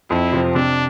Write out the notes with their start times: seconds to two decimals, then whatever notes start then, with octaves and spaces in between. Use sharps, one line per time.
0.10 F2 E4
0.33 C3 F3 C4
0.54 C3 D4